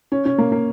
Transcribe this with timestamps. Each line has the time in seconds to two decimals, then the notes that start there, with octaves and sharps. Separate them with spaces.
0.12 C#4
0.25 C#4
0.38 A#3
0.52 A#3